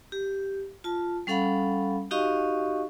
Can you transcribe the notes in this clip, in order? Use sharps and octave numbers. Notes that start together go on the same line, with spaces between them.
G4
F4 A5
G3 C#4 A4 F5 F#5 B5
D#4 F#4 G4 D#5 F5 C#6